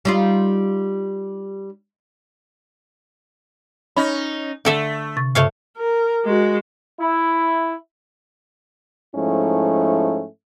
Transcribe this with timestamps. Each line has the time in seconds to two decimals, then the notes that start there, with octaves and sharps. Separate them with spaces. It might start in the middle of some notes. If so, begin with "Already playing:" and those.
0.05 G3 D#4 F4
3.97 C#4 D#4 B5
4.65 D3 A3 A4 E5
5.17 C3 C#6 A6
5.35 G2 C#3 A3 C#5 F5
5.77 A#4
6.24 G#3 F#4
6.99 E4
9.16 G#2 F3 A3 C#4 E4